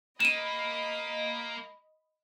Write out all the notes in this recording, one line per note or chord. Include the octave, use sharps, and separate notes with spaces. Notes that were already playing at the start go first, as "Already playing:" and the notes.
A#3 D#5 B5 D#7 E7